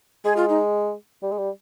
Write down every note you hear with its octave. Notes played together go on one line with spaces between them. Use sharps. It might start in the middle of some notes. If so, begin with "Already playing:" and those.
G#3 G#4
F4
D#4
G3
G#3
G3